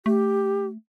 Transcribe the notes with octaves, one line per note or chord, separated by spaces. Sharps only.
A3 G4